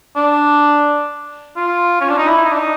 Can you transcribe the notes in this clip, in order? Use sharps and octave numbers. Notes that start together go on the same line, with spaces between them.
D4
F4
C#4
D4
D#4
E4
D#4
D4
D#4